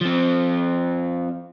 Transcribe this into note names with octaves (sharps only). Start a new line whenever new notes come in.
F3 C4